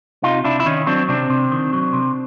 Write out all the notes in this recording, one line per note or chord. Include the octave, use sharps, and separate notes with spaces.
C3 D#4 F4
C3 D4 E4
E4
D#3 C#4 D#4
F#3 C4 D4
C3 C4 D4
C3
D#3
F#3
C3